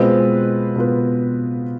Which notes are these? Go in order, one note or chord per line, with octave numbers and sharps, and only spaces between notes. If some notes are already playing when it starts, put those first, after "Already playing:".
Already playing: B2 G#3 B3 C4 F4 B4
B2 B3 F4 B4